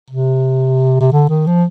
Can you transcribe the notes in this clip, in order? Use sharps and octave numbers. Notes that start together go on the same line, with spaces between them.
C3
C3
D3
D#3
F3